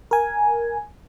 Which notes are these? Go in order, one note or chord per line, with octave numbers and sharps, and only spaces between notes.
A#4 G#5